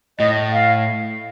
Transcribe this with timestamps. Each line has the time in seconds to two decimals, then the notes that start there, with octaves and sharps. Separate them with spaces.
0.19 A2 D#5
0.52 F5